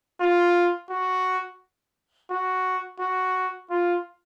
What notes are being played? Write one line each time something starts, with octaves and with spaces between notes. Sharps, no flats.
F4
F#4
F#4
F#4
F4